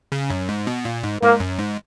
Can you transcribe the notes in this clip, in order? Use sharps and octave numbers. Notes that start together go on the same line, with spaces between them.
C#3
F#2
G#2
B2
A#2
G#2
G#2 A#3
F#2
G#2